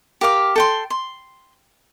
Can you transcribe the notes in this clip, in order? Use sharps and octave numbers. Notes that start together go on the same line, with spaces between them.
G4 A#4 F5 D6
A4 G5 C6
C6